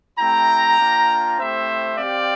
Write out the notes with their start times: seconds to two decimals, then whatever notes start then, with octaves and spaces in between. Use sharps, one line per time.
0.19 A3 C4 E4 G4 G5 A#5
0.78 A#3 D4 F4
1.38 A3 C4 E4 G4 C5 E5
1.97 C4 G4 D5 F5